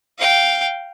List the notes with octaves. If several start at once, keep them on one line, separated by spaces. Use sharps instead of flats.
F5 G5